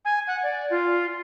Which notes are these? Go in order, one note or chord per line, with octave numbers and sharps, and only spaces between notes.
G#5
F#5
D5
F4